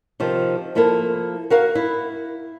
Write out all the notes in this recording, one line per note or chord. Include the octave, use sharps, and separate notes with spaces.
C3 D#3 F3
F3 A#3 E4 A4 A#4
F#4 A#4 F5 F#5
E4